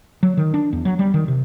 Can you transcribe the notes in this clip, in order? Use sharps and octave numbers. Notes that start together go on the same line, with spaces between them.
F#3
D#3
D4
E2
F#3
G3
D#3
C3